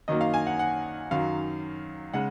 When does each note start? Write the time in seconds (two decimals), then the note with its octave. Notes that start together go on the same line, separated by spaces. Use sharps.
0.08 F#2 D#3 F#3 A#3 D#5
0.21 F5
0.34 G#5
0.47 F#5
0.59 F#5
1.11 F#2 D#3 F#3 F5
2.14 C#3 G#3 F#5